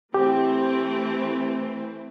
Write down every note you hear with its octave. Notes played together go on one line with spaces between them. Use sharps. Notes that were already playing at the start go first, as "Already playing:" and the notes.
E3 A3 C4 G4